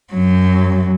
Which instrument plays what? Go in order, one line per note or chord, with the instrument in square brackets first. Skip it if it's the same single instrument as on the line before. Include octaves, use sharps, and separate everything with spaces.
[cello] F#2 F#3